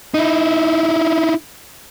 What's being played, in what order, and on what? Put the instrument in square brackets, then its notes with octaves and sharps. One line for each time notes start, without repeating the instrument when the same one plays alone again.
[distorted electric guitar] D#4 E4